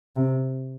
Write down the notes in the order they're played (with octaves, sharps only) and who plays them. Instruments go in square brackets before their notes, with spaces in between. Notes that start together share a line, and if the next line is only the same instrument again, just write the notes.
[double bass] C3